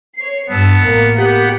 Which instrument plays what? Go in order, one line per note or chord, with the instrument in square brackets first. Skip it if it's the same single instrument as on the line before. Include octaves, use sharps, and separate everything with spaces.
[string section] C#5 C7
[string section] G2 A5 E6 [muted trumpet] B3
[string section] A1 A#3 A#4
[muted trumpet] B3 [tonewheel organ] G4 F#5